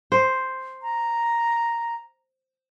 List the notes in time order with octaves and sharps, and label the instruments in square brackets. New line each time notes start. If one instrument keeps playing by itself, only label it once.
[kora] C5
[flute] A#5